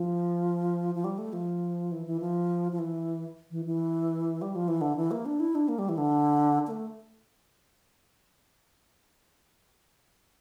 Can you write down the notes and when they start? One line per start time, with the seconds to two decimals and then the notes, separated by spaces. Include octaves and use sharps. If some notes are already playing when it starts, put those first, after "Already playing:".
Already playing: F3
0.95 F3
1.04 G3
1.18 A3
1.33 F3
1.92 E3
2.06 E3
2.21 F3
2.72 F3
2.79 E3
3.51 E3
3.65 E3
4.42 G3
4.55 F3
4.68 E3
4.81 D3
4.97 E3
5.11 A#3
5.26 D4
5.40 E4
5.55 D4
5.68 A#3
5.79 G3
5.89 E3
5.98 D3
6.67 A#3
6.71 A3